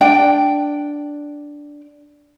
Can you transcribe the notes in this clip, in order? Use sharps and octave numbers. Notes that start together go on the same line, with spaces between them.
D4 D5 G5